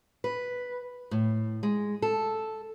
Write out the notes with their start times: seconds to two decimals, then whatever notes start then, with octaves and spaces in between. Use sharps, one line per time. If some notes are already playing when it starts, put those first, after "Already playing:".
0.24 B4
1.11 A2
1.63 G#3
2.02 A4